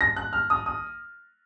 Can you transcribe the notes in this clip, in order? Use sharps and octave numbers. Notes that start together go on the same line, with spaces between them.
A#6
F#6
F6
D#6
D#6